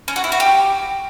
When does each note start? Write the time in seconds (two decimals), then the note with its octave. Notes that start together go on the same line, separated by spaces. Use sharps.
0.08 C#4
0.16 F#4
0.24 E4
0.32 F#4
0.40 G4